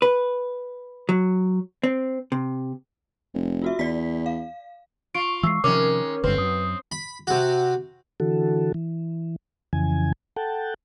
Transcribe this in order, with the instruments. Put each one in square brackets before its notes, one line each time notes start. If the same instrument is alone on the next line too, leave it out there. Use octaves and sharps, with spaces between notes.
[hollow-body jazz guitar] B4
F#3
C4
C3
[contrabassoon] F1
[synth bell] F4 F#4 E5
[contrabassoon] E2 [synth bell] D5 B6
[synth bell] F5
[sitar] F4 [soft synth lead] C#6 [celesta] D7
[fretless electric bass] E3 F#3 G#3 [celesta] E6 C7
[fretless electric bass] C3 F3 [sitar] D#3 G#3 C#4 [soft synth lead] A#4 [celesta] D6
[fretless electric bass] F#1 G2 [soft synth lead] D3 [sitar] C4 [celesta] B4
[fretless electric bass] F#2 [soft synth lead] D#6
[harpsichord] B5
C3 F#4
[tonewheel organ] D3 E3 F#4 A4
E3
F2 C#3 E3 G#5
A4 F#5 G5 A5